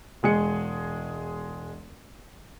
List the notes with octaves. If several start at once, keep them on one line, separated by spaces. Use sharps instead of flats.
E1 G#3 G#4 C#7